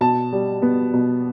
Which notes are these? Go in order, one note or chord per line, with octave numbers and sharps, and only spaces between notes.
B2 A5
G3
B3
B2